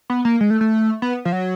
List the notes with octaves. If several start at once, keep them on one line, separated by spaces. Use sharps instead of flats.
B3
A#3
G#3
A3
A3
B3
F3
F#3